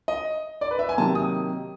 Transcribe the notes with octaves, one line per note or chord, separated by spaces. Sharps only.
D#5
D5
B4
E5
G#5
C3 D#3 F#3 A#3 A5
D#6